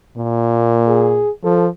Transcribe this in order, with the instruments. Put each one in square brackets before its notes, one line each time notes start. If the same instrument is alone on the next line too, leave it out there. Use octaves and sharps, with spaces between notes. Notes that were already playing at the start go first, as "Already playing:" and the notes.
[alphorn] A#2 [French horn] A#3
[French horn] G#4
[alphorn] F3 [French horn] A4